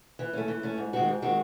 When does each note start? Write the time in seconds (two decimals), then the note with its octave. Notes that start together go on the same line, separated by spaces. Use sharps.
0.19 E3
0.33 A3 C#4
0.48 E3
0.63 A3 C#4
0.78 G#2
0.93 D#3 G#3 C4 F#4
1.08 G#2
1.22 D#3 G#3 C4 F#4